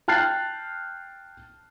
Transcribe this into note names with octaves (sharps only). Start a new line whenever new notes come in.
G5 A5 F6 F#6 A6 C7